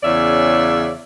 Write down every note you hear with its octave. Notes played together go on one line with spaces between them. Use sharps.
E2 C#3 C#4 D5 E5